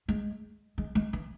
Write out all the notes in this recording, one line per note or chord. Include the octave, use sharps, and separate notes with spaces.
G#3
G#3
G#3
E3